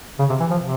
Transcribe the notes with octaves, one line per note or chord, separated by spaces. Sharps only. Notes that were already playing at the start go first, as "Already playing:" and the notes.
C#3
C3
E3
F3
C3